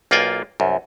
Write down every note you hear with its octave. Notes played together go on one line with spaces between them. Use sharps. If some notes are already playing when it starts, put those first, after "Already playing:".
B1 A#3 F4 D5 G5 G#5
C2 F#2